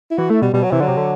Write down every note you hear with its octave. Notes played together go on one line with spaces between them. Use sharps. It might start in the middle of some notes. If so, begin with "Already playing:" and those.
E4
E3 F#4
A3 E4
B2 G3
B2 G3
F#3
C3 E3
D3 F#3
C3
D3